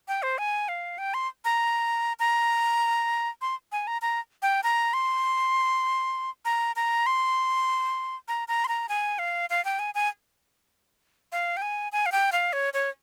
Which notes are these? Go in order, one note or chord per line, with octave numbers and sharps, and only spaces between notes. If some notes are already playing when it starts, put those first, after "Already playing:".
G5
C5
G#5
F5
G5
C6
A#5
A#5
C6
G#5
A#5
A#5
G5
A#5
C6
A#5
A#5
C6
A#5
A#5
C6
A#5
G#5
F5
F5
G5
G#5
G#5
F5
G5
G#5
G#5
F5
G5
F5
C#5
C#5